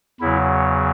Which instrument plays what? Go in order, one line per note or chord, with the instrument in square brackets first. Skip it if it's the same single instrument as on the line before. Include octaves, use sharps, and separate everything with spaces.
[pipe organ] E2 C#3 F#3 E4